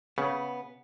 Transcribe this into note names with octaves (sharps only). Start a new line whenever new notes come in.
C#3 B3